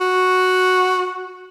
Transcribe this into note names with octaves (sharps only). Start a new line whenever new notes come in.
F#4